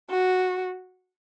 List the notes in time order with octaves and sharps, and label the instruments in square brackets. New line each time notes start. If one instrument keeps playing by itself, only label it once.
[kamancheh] F#4